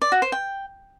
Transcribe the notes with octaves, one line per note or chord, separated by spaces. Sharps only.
D5
F#4
C5
G5